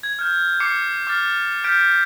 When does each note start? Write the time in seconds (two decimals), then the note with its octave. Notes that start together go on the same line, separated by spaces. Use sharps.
0.03 G#6
0.19 F6 G6
0.60 D6 G6 C7 C#7
1.07 D6 F6 A6
1.64 F6 G6 B6 D7